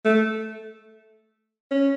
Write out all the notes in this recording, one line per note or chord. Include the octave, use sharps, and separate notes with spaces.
A3
C#4